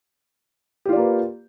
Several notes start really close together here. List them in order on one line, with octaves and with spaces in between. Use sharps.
G4 F4 D5 A#3 B4